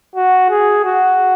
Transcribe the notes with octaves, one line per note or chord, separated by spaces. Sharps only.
F#4
G#4
F#4